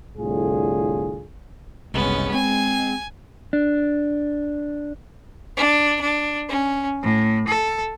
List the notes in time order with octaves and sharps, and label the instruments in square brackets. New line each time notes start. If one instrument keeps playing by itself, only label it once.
[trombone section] C2 A2 D3 F4 G#4
[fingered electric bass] F#1 C2 [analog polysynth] G#3 [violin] B3 C#4
[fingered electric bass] C4 [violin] G#5
[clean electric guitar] D4
[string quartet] D4
D4
C#4
A2
A4